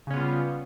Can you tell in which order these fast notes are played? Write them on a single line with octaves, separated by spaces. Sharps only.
C#3 C#4 B3 F4 G3